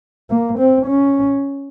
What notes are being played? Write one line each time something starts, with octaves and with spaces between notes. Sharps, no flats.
A#3
C4
C#4